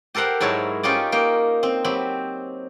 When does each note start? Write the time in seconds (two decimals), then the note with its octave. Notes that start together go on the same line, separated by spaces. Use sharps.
0.15 G4 A4 A#4 C5 F#5
0.41 G#2 F#3 E4 A#4 C#5 A5
0.83 C#4 D#4 F4 G4 D5
1.12 A#3 D#4 G5
1.63 C4
1.84 F#3 C4 G4 B5